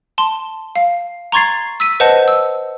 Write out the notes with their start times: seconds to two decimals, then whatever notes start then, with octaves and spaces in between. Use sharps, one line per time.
0.18 A5 C6
0.76 F5
1.32 A#5 C6 C#6 G#6 A6 C7
1.80 E6 B6 D#7
2.00 B4 C5 D#5 F#5 A5 G6
2.28 E6